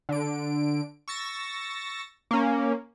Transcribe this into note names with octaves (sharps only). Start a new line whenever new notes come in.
D3 D7
C#6 E6 A6 A#6
A#3 C#4